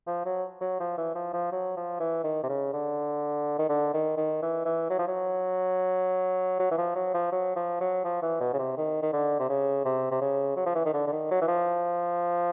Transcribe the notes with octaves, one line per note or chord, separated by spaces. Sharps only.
F3
F#3
F#3
F3
E3
F3
F3
F#3
F3
E3
D#3
C3
C#3
D3
D#3
D3
D#3
D#3
E3
E3
F#3
F3
F#3
F#3
E3
F3
F#3
F3
F#3
F3
F#3
F3
E3
B2
C#3
C3
D#3
D#3
D3
C3
C#3
C3
C3
C#3
F#3
F3
E3
D#3
D3
D3
D#3
F#3
E3
F3